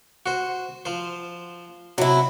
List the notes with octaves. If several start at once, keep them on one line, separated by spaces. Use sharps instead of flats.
F#4 C5
F3 C5
C3 F#3 E4